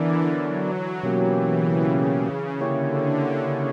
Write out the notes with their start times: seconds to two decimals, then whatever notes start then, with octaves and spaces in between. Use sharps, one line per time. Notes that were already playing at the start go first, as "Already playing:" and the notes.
Already playing: D3 E3 B3 D4 A#4 D5
0.24 F#3
1.03 B2 E3 F#3 A#3 C#4 G4
1.42 C#3
2.60 D3 A#3 C#4 E4 G4 C#5
3.39 C#3